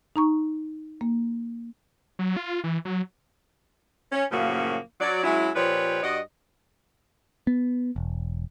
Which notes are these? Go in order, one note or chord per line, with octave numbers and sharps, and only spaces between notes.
D#4 A#5 C#6
A#3
F#3
F4
E3
F#3
C#4
F#2 A2 C#3 F3 A#3 F#4
F#3 D5
F#3 G#3 C#4 E4
A#2 F3 G4 B4 C#5 D5
G2 F#4 D5 D#5
B3
E1